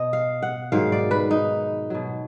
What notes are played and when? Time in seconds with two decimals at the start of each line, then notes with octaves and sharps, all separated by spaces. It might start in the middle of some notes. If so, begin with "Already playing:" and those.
Already playing: B2 D#5
0.13 F5
0.43 F#5
0.72 G#2 D#3 F#3 F5
0.92 D5
1.11 B4
1.31 D#4
1.90 B2 F#3